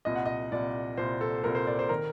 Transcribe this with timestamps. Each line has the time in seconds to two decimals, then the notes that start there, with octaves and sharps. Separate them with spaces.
0.05 C2 A#2 D#5
0.16 F#5
0.25 D#5
0.52 C2 A#2 D5
0.97 C2 A#2 C5
1.21 A4
1.43 C2 A#2 A#4
1.55 C5
1.67 D5
1.79 C5
1.89 D#3 A#4